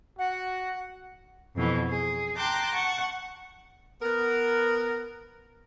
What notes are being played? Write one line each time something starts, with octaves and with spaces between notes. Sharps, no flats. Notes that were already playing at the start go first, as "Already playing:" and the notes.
F#4 F#5
F2 B2 E3
G#4
G5 A5 A#5 C6 D6 F#6
F#5 A5 C#6
B3 A#4